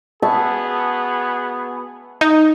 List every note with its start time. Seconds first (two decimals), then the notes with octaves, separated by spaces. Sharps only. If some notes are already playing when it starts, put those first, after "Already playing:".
0.22 B3 F#4 G#4 E5 A5 C#6
2.21 D#4